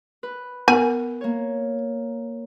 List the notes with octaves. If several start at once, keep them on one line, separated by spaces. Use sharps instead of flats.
B4
B3 A#4 G#5
A#3 C#5